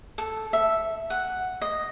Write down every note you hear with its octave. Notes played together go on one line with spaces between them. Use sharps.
A4
E5
F#5
D#5